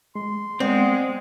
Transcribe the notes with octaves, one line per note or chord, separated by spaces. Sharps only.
G#3 C6
G#3 B3 C4 D5